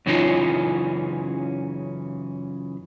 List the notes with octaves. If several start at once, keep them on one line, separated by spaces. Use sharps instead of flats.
F#2 C#3 E3 C#4 D#4 F4